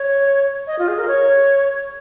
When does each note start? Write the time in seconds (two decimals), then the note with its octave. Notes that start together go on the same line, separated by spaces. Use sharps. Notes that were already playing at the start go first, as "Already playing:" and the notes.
Already playing: C#5
0.67 D#5
0.79 F4
0.88 G#4
0.98 A#4
1.08 C#5